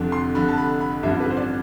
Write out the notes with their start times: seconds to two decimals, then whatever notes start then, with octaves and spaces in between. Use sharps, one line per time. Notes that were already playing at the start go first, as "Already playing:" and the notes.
Already playing: F1 F2 D3
0.12 C6
0.35 F1 F2 D3 B5
0.48 A5
0.58 B5
0.81 B5
1.03 A1 G2 D3 F3 C4 E5
1.20 B4
1.30 C5
1.37 D5